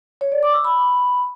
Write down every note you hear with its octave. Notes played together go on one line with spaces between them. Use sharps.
C#5
D5
D6
E6
B5